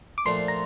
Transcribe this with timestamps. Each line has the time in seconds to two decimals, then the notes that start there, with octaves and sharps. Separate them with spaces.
0.18 D6
0.26 A#2 F3 A3 D4 A4 C6
0.48 A#5